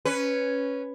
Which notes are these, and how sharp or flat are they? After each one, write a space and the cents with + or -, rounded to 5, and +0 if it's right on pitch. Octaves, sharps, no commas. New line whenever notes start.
C#4 +0 B4 +0